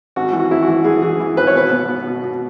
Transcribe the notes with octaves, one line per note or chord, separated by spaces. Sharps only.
G#1 F#4
E3
F#4
G#1 E4
F#4
E3
E3 G#4
E3 G#4
E3
G#1 B4
C#5
B2 B4
B3
B3
B2
B2